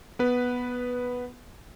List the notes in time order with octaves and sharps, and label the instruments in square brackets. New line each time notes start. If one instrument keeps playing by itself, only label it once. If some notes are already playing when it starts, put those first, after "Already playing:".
[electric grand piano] B3 B4